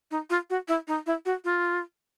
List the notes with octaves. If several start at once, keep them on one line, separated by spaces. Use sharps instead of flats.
D#4
F4
F#4
E4
D#4
E4
F#4
F4